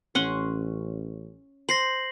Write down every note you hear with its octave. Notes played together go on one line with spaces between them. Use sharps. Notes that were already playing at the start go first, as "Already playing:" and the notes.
A1 C#4 F#5 C6
C5 A#6 C7 F#7